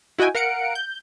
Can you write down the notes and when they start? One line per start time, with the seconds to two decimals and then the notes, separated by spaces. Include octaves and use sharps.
0.18 E4 F#4 D#5 G5 G#5
0.35 A#4 F5 F#5 C#7 D7
0.75 G6